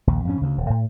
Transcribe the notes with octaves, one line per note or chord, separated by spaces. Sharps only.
A#1 D#2
F2 G#2 C#4
D2 C#3
D#1
A2